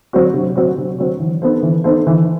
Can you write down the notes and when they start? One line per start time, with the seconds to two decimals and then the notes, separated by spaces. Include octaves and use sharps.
0.13 F#3 C4 F#4
0.34 C3
0.56 F#3 C4 F#4
0.77 C3
0.99 F#3 C4 F#4
1.20 E3
1.42 B3 D#4 A4 C5
1.63 E3
1.84 B3 D#4 A4 C5
2.07 E3